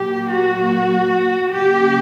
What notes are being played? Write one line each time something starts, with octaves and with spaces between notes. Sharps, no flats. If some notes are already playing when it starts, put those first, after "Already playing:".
Already playing: A#2 F#3 A#3 G4
F#4
C#3 F#3 A#3 G4